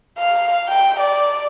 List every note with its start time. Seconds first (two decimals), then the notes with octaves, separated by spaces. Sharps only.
0.18 F5
0.68 G5
1.00 D5